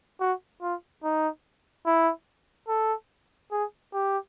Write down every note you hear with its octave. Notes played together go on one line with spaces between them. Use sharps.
F#4
F4
D#4
E4
A4
G#4
G4